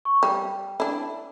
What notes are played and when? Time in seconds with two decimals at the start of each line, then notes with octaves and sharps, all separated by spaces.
0.05 C#6
0.23 G3 G5
0.80 D4 E4